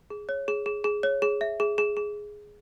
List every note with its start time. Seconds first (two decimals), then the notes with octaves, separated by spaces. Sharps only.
0.10 G#4
0.29 C#5
0.48 G#4
0.66 G#4
0.84 G#4
1.03 C#5
1.22 G#4
1.41 E5
1.60 G#4
1.78 G#4
1.97 G#4